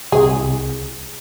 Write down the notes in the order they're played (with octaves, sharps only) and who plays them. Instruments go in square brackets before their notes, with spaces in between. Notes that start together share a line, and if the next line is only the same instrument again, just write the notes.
[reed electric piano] C2 [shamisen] G#4